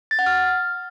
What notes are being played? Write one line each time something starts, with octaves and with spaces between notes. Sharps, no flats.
A6
F#5
F6